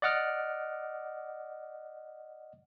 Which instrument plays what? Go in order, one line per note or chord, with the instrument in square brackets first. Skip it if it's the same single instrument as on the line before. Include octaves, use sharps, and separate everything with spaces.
[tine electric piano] D5 D#5 F#5 D6 F6